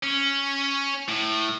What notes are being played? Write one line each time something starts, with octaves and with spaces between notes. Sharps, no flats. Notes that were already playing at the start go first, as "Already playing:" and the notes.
C#4
A2